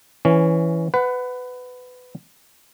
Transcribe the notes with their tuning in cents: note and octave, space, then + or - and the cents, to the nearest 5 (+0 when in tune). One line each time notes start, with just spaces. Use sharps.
E3 +5 C#4 +10
B4 +20 F#5 +0